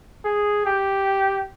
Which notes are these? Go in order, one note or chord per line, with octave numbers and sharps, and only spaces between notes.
G#4
G4